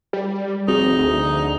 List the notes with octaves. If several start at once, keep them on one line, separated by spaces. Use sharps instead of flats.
G3
F1 C4 D#4 F#4 G#4
D2 G#4